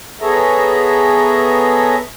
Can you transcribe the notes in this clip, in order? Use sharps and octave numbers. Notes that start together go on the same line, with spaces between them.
B3 G#4 A4 C#5 E5 A#5